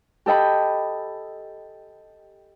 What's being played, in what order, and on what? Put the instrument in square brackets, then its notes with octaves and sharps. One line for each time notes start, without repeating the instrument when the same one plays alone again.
[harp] G4 A4 D#5 G5 B5